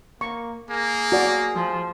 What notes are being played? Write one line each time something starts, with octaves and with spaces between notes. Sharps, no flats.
A#3 C#6
A#3 G#4
F#4 D5
F3